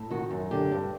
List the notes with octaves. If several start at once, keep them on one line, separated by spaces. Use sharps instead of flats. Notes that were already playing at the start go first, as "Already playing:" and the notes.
Already playing: A2
D#3 F#4
F#2
D3 G4
G2